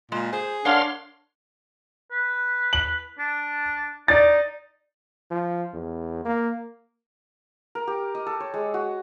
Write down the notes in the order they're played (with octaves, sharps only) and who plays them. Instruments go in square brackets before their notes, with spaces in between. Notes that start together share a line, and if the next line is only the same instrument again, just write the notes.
[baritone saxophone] A#2 [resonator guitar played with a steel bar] G#3
[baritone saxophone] G#4 [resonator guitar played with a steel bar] C5
[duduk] D4 [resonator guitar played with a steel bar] A#4 C#5 F#5 [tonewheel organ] F5 C6
[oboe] B4
[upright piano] F#7
[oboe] D4
[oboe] D#4 [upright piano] D5 A6
[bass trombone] F3
E2
A#3
[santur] A#4
G4
D#5
A4
C#5
G#3
F#4